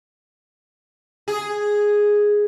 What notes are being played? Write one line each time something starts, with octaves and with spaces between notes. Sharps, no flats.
G#4